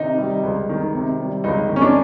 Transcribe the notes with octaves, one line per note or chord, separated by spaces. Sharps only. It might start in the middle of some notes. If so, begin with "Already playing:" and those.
Already playing: C3 D#3 D#4
G3
C#2
D#3
C3
G3
C#2 D#4
D#3
C#4
D4